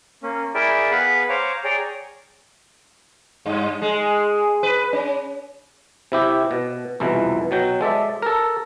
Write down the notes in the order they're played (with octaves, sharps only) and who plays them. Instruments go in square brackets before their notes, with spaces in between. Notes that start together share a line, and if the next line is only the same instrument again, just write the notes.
[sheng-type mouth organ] A#3 C#4
E4 G#4 A#4 D5 E5 G5
B3 G#4 B4 F5 F#5 B5
C5 C#5 F5 A#5 D6
G#4 C#5 D5 G5 A#5
[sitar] G2
G#3
B4
C#4
[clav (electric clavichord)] C3 E4 G4
B2
C2 F2 B2 E3
B2 F#3 G5
G#3 A4 D5 E5
A4 A#4